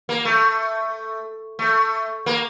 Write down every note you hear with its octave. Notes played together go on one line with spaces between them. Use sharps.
A#3
A3
A3
A#3